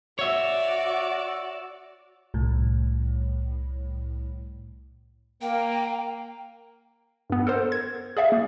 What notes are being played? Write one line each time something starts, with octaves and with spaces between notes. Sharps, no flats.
F#4 C#5 D5 E5
C2 A2
A#3 G5
G2 B3
A4 A#4 C5
G#6
G#4 D5 E5 F5
A#3